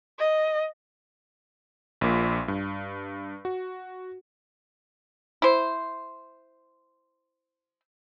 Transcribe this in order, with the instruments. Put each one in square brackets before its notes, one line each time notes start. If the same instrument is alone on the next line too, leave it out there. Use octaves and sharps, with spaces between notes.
[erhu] D#5
[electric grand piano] A#1 A#2
G2
F#4
[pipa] E4 C5